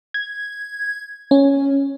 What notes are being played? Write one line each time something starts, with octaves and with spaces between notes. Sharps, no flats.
G#6
C#4